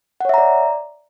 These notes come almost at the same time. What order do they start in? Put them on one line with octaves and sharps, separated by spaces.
F#5 C#5 E5 A#5 D5